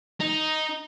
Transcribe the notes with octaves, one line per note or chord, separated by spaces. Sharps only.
D#4